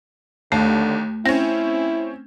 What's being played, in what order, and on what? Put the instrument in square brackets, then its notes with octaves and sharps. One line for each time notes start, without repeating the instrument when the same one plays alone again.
[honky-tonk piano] D#2 [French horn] D3 [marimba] A3
[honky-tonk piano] C4 C#4 [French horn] E4 [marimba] A#6